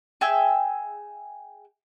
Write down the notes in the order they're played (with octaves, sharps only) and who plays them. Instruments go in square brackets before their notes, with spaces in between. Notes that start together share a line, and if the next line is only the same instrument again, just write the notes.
[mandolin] G#4 E5 G5 E6